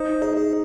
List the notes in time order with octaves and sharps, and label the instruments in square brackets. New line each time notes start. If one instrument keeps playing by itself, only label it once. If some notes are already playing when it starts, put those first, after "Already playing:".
Already playing: [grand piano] D#4 [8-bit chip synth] C5
[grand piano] D#4 [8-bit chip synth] G#4
[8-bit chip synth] G#4